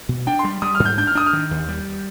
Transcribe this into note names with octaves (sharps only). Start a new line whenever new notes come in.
B2
D4 G5
C6
G3
G3 D#6
F6
G#2
G6
D4 G6
F6
D4 D#6
F6
D#3
D#2
G3